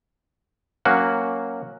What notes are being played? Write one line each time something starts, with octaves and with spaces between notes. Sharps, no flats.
F#3 A#3 C#4 F#4